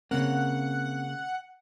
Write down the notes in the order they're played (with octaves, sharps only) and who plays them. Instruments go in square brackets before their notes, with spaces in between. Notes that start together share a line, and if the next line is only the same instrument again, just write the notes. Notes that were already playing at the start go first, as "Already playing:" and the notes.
[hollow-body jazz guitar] C#3 A#3 [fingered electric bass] C4 [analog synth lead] F#5